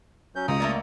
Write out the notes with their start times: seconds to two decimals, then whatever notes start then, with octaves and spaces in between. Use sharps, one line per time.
0.35 F#3 C#4 G6
0.48 C#2 A#5 D#6
0.60 A3 A#3 D5